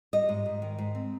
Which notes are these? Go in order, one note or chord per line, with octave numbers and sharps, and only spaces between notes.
G3 D#5
G#2
G#2
D#3
G#2
C4